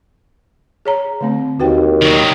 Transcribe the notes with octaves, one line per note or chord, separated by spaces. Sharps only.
G#4 C#5 A#5
D3 A3 C4
D#2 F#4 B4 G5
D#3 F#3